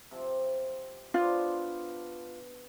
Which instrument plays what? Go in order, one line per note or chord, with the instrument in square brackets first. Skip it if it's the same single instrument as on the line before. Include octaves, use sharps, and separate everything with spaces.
[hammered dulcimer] C3 F3
[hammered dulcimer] B3 D4 C5 [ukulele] F4